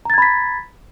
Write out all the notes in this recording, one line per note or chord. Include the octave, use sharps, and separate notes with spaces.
A#5 B5 G#6 A6 B6